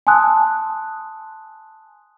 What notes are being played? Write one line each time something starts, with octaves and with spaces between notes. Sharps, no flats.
G#5 A5 C6 D#6 E6 F#6